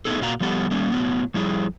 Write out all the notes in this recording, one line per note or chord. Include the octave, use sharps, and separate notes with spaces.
A3 B3 D#4 G#4 A4
A#2 A#3 F#4 F5 A#5
F3 G3 B3 G4 A4 F#5
G3 A3 A#3 C#4
A2 F#3 B3
F3 G3 E4 G#4